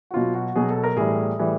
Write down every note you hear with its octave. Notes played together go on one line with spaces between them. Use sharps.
F#4
B2 F#3 F4
F#4
B2 F#3 G#4
A4
A#4
A2 E3 G3 G#4
A2 E3 G3